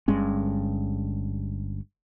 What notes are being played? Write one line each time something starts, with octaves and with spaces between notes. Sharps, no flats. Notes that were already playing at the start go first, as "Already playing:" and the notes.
G1 G2 G#3 C#4